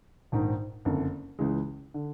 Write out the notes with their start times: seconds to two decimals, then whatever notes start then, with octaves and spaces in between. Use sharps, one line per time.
0.32 A#1 G#2 D#3
0.85 F#1 F2 D3
1.39 C#2 C#3 E3 G#3
1.94 D3